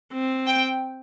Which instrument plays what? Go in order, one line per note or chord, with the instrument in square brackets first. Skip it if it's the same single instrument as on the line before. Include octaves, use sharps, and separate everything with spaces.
[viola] C4
[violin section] G5